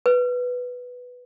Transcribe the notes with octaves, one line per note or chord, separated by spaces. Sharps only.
B4